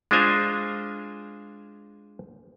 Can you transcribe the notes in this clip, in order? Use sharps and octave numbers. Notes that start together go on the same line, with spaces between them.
G#3 D4 F4 C5 G#5 A#5